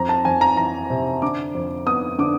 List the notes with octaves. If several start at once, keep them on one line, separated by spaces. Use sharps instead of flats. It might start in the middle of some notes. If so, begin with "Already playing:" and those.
Already playing: F2 A#5
A5
F2 G#5
A#5
E3 A#5
C3
D3 D6
F2
B3 D#6
D3 D6